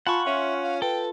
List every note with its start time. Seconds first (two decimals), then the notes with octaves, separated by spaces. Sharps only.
0.07 F4 F#5 G#5 A5 B5 C#6
0.26 C#4 E5 C6
0.62 F5
0.82 A4 B4 G5